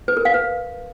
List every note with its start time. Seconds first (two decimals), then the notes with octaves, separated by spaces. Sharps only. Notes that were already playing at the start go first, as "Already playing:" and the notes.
0.08 B4
0.17 A#4
0.25 F5
0.34 B4